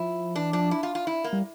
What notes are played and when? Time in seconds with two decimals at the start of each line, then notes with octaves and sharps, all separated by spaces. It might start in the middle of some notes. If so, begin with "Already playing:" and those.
Already playing: F3 E4
0.36 E3 D4
0.53 F3 D4
0.71 E4
0.83 F4
0.95 F4
1.07 E4
1.24 A#3
1.33 G3